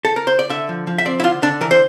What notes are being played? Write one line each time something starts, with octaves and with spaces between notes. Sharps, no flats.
A4
A#4
C5
D5
D3 E5
F3
F3
E5
C4 D5
E4
D3 F4
D3 D4
E3 A#4
C5